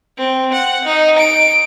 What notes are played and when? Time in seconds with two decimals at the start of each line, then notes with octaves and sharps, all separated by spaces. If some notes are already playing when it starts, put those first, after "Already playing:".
0.18 C4
0.53 F#5
0.86 D#4
1.19 D7